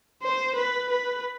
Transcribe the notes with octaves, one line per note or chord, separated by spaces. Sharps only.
C5
B4
B4